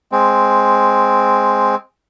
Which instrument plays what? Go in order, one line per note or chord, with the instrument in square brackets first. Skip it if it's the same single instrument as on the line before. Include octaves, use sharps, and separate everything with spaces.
[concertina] G#3 C4